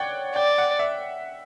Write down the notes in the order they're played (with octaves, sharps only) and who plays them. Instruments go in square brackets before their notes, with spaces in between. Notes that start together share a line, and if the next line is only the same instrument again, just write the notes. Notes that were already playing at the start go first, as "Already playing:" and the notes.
Already playing: [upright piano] C#5 D5 F#5 G5
[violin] D5 [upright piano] G5
[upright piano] F#5
E5